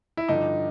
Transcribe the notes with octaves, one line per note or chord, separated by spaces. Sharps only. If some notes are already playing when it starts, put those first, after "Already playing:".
E4
G2 D3 F3 D#4